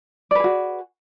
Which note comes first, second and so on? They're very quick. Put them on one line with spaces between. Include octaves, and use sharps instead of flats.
D5 B4 G#4 F#4